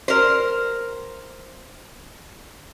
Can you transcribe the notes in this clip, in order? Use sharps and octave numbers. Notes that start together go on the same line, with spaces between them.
A#4 C5